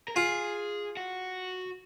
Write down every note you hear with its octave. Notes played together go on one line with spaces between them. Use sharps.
A#4
F4 G#4
F#4